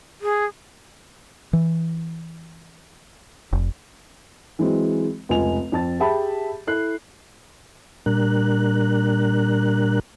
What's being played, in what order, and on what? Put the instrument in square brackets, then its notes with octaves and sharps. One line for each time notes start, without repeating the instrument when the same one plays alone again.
[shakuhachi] G#4
[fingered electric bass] E3
F1
[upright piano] E3 F#3 G#3 C4
F1 C#2 F4 G#5 F7
F2 A5 A6
G4 G#4 E5 G5 A5 B5
E4 A4 F#6 C7
[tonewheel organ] A#2 G3 D4 A#4 F#6